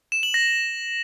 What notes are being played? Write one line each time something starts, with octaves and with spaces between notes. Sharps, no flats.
E7
F#7
A#6